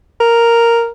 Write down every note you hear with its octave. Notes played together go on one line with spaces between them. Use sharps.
A#4